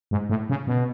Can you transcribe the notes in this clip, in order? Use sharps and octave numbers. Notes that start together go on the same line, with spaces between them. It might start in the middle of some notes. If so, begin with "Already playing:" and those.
G#2
A2
C#3
B2